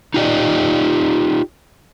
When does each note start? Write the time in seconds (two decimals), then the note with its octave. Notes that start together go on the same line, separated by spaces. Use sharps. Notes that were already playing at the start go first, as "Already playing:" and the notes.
0.14 D#4 F4 G4 D5 D#5